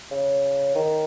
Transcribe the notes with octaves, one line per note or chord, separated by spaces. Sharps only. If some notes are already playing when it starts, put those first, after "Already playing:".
C#3
D#3